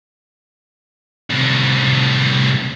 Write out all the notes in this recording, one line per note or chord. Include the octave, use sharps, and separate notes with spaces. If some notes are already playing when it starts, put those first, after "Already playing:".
C2 A2